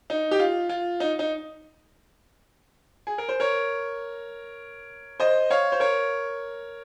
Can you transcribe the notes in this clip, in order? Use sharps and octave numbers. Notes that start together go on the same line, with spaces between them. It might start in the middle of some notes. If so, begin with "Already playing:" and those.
D#4
G4
F4
F4
D#4
D#4
G#4
A#4
C5
A#4 C#5
C5 D#5
C#5 F5
C5
A#4 C#5